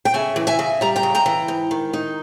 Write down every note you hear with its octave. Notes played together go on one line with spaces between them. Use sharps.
G5
C#3 E5 G#5
E3
E5 G#5
C#3
G3 A#5
G5 A#5
C#3
G5 A#5
E3
G#2
D#3
D#4